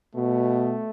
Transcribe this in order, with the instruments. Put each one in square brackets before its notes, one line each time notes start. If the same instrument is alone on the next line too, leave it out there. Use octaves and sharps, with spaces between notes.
[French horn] B2 [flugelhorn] A3